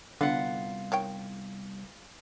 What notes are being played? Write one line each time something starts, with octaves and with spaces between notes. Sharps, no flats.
C2 D3 B3 F4 F#5
D#3 C#5 G5